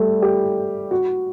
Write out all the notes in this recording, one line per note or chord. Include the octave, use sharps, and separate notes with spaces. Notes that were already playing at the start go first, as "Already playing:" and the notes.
Already playing: G3 A3
G4
F#4